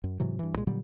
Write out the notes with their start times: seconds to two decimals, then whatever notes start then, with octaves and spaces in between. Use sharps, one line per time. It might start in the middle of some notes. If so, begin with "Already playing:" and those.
0.04 F#2
0.20 G#2 C3 E3 F#3
0.39 G2 E3
0.54 C2 A#2 G#3
0.67 A#2 D3 F#3 G3